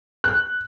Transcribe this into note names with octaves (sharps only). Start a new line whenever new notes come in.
F#6